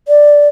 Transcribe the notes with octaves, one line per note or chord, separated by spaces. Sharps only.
D5